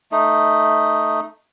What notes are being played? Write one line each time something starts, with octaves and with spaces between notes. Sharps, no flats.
A3 D#4